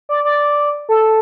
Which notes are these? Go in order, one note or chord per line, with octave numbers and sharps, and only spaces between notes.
D5
D5
A4